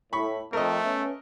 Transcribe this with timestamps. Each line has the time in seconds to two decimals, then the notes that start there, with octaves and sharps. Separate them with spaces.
0.13 A2 B5 C#6
0.53 F2 A3 A#4 D#5
0.83 B3 C#4 E5